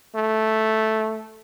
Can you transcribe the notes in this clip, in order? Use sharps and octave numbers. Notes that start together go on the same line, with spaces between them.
A3